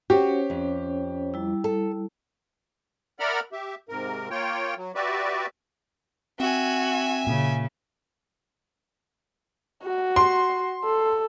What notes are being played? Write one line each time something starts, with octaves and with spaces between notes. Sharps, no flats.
C#4 F#4 G4 C5 C#5
F2
G3 E4
A4
A#4 D5 E5 F#5 B5 F6
G4 E5
G#2 C3 A#4
A#3 F4 C#5 G5
F#3
F#4 G4 B4 D5 E5
C4 F#4 E5 G#5
A#2 C#3
F#4
C6
A4